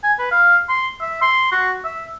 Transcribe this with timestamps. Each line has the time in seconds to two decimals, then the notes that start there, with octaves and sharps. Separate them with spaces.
0.04 G#5
0.19 B4
0.31 F5
0.69 C6
1.01 E5
1.22 C6
1.52 F#4
1.84 E5